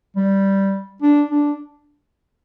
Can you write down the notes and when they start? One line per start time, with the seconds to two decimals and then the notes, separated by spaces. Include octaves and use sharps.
0.16 G3
1.02 D4
1.31 D4